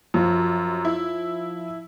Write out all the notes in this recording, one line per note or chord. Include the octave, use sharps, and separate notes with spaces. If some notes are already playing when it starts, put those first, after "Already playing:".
F#2 F3
E4